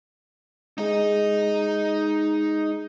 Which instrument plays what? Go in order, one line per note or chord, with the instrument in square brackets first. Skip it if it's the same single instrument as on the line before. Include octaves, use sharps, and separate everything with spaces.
[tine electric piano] G#3 G#4 [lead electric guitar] D#4 D#5